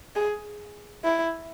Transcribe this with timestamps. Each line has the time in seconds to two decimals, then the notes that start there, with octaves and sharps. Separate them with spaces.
0.15 G#4
1.04 E4